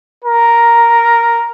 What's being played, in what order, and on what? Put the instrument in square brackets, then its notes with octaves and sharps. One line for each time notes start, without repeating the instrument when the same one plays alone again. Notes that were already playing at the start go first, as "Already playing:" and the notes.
[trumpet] A#4